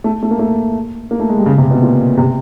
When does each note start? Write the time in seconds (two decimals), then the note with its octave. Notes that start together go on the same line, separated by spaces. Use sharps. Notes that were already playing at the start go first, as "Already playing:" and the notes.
0.04 A3
0.23 A3
0.31 A#3
0.39 A3
1.11 A#3
1.20 A3
1.29 G#3
1.38 G3
1.46 C#3
1.58 C3
1.71 B2
1.82 A#2
2.17 C3